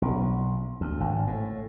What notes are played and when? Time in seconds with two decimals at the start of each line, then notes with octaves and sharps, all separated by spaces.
0.02 B1
0.81 D2
1.00 G#1
1.27 A2